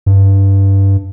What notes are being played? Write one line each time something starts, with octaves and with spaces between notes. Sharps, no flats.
G2